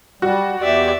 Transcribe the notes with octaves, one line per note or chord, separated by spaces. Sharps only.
G3 F#4
E2 G4 D5 E5